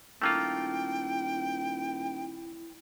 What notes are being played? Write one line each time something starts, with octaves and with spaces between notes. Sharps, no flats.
D#1 A3 A#3 E4 F4 G5